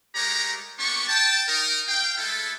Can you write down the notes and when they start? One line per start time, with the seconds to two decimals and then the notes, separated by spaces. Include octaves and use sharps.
0.16 G#3 A3 G4 A#4 C#5 A#5
0.79 A#3 B3 D4 G4 C#6
1.08 G5 A5
1.48 D#4 A#4
1.87 F5 G5
2.18 G#3 A3 E4 A4